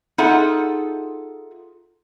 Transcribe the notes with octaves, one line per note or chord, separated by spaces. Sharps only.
D#4 F4 G#4 A4 E5 F#5